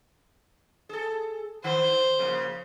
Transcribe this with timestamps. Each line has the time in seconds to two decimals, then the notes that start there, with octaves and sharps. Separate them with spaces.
0.89 G#4 A4
1.64 D#3 C5
2.19 C#3 F3 A#3